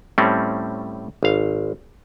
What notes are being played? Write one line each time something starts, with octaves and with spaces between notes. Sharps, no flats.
A2 G3 A3 C4 C#4
G#1 F5